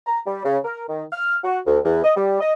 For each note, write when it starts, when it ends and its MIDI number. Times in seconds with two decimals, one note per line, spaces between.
0.07 0.20 82
0.27 0.43 55
0.45 0.58 49
0.65 0.83 70
0.88 1.03 51
1.12 1.37 89
1.44 1.59 66
1.66 1.79 38
1.84 2.02 40
2.04 2.15 75
2.16 2.39 55
2.41 2.53 75